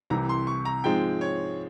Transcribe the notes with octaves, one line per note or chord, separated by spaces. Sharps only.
C2 C3 E3 A#5
C6
C#6
A#5
G#2 F3 G#3 C4 G5
C#5